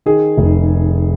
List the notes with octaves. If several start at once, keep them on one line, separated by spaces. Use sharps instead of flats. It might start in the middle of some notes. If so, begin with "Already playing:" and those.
D#3 G#4
F1